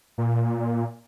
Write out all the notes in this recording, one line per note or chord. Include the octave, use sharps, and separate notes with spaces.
A#2